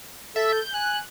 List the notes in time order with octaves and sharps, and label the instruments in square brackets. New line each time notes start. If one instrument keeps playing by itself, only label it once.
[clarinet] A4 [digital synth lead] E5
[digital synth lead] G6
[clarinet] G#5 [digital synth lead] F#6